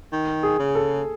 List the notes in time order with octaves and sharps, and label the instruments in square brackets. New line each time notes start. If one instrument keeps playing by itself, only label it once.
[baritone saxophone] D#3
[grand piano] G#4
[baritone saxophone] C#3
[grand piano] A4